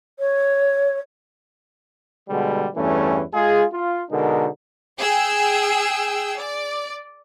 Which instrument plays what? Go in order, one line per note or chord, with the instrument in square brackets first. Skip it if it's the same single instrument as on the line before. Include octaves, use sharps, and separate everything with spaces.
[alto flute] C#5
[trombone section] B2 D3 G3 G#3
E2 G2 E3 A3 C#4
G#3 F4 G#4
F4
B2 D3 G#3 D#4 A#4
[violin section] G#4 G5 E6
D5